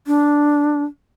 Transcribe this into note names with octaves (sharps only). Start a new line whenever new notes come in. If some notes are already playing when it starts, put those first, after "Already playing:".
D4